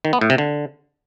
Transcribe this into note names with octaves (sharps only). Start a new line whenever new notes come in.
D#3
B3
A2
C3
D3